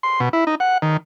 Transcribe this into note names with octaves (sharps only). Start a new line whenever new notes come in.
C6
B2
E4
D#4
F#5
D#3